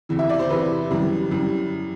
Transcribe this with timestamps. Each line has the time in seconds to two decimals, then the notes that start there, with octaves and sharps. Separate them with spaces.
0.09 E2 C3 E3
0.19 E5
0.29 D5
0.39 C5
0.50 E2 C3 E3 B4
0.91 F#2 E3 G3
1.31 F#2 E3 G3